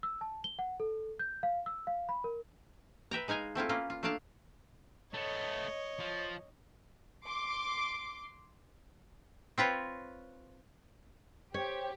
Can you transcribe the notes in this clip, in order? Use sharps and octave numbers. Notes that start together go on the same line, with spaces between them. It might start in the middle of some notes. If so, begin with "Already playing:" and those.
E6
A5
G7
F#5
A4
G6
F5
E6
F5
B5
A#4
B4 E5 G5 A#5
G#3 D#4 F5 G#5 A#5
A3 C4 E4 F4
A#3 C#4 F4 B4
F4
A3 A#3 D4 D5 F5 A5
A3 B3 C#5 D#5
F3
C6 D6
C4 F4 B4 C#5
G4 C5 C#5